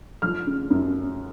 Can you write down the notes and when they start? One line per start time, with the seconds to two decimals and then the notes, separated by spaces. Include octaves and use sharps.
0.22 F3 F6
0.47 C#3
0.70 F#2